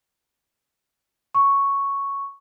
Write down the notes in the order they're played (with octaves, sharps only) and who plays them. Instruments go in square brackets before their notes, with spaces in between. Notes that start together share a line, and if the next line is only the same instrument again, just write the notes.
[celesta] C#6